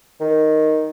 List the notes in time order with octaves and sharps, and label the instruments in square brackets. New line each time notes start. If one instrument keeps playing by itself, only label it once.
[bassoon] D#3